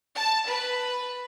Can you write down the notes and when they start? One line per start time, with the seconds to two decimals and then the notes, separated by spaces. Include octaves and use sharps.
0.15 A5
0.48 B4